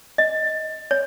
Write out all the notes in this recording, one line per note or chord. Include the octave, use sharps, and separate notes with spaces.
D#5
C#5